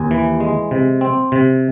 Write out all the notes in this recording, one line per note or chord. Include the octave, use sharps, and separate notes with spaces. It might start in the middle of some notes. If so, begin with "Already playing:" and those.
Already playing: D#2 G#5
E3
G#3
C3
C4
C3